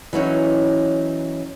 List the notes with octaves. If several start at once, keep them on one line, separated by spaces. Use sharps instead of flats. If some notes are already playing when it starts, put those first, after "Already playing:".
E3 F#3 C#4 D#4